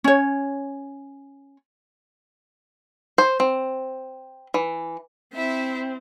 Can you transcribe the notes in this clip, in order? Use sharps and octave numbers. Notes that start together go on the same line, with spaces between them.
C#4 C#5
C5
C4
E3
C4 E4 E5